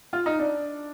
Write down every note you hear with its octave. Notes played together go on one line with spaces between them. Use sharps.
F4
D#4
D4